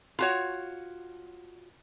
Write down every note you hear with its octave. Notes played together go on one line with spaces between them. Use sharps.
F4 F#4 C#5